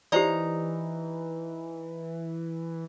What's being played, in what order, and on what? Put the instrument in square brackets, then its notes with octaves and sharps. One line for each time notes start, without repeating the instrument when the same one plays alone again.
[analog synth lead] E3 [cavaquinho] D#4 A#5 D#6 [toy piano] G4 C5 D5